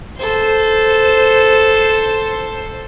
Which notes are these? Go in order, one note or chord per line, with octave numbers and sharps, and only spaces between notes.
A4 C5